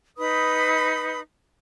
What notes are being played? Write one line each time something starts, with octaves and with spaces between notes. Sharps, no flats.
D#4 B4 B5 D#6